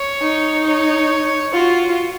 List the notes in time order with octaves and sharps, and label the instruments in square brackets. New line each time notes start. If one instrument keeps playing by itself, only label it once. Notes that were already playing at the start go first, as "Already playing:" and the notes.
Already playing: [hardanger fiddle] C#5
[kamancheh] D#4
[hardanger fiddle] C#5
[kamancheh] F4 [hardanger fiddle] F#4